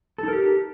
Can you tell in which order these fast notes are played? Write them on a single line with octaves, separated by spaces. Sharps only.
A4 D#4 A#4 G4